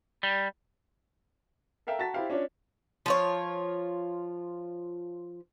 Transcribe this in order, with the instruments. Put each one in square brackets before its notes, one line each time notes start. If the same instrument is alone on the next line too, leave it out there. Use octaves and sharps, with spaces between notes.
[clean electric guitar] G3
[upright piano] A4 A#4 E5 F5 G5
F#4 A5 A#5 A6 B6
E4 G4 C5 F5 G5
C#4 D4 F4 C#5
[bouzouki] F3 F4 C#5